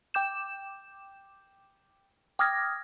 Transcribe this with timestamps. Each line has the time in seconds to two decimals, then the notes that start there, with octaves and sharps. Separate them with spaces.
0.14 G5 D6 G6 E7
2.39 G5 D6 D#6 F6 G#6 A#6